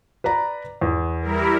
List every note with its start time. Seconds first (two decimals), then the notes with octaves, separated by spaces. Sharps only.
0.24 B4 D5 A#5
0.81 E2
1.21 G3 E4 A#4